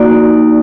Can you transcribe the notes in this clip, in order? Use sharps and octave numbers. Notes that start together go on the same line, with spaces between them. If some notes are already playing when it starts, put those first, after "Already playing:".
Already playing: A#3 D#4 F#4 D5